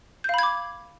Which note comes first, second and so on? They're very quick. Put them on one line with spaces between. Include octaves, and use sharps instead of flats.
G6 F5 B5 G#6 D6